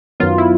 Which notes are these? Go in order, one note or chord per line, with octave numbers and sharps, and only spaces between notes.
F#2 D#3 F#3 B3 F4
E4